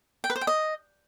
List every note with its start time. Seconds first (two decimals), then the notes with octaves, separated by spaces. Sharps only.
0.24 G5
0.30 B4
0.36 C5
0.41 G5
0.47 D#5